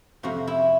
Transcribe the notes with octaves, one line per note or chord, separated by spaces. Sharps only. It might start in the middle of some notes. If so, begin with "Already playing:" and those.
F2 C3 F3 F#4
E4